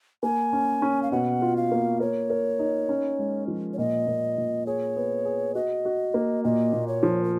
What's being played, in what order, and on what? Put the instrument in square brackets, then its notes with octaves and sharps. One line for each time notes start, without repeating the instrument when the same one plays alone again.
[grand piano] A#3 [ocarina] G#5
[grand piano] C#4
C#4
[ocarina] F5
[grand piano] B2 [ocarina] F#5
[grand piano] F4
[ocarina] F5
[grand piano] A#3
[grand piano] A#4 [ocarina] C#5
[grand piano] A#4
D#4
C#4
G#3
F3
[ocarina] C#5
[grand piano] A#2 [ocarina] D#5
[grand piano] A#2
A#2
[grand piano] G#4 [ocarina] C#5
[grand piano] B3
G#4
[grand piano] F#4 [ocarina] D#5
[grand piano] F#4
A#3
[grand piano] A#2 [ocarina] D#5
[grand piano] A#2
[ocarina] C#5
[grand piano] F3
[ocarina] A#4